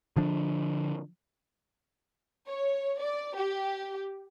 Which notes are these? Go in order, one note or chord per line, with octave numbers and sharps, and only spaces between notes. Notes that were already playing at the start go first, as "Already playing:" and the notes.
D3 F3 D4
C#5
D5
G4